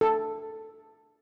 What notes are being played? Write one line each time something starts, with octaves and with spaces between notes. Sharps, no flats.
A4